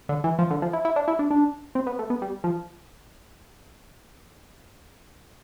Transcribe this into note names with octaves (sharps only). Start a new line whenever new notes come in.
D3
E3
F3
D3
F3
E4
E4
D4
E4
D4
D4
C4
B3
A3
B3
G3
F3